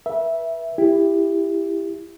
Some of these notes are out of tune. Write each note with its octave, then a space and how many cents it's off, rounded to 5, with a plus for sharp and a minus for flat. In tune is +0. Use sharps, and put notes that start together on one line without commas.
B4 -35 E5 +0
E4 +15 G4 +20